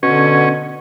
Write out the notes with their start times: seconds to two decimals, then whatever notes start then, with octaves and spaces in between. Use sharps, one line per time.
0.03 B2 D3 C#4